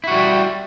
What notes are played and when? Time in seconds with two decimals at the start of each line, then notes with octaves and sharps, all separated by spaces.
0.04 E4
0.08 F#4
0.11 G3